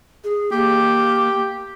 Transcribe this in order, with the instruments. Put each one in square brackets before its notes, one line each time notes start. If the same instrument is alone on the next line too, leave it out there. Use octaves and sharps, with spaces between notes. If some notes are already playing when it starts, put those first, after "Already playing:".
[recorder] G#4
[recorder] A#3 [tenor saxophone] G4